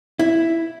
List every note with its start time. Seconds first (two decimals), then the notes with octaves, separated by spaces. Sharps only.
0.19 E4